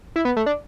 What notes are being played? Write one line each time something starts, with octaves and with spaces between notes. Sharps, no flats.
E4
B3
A3
D4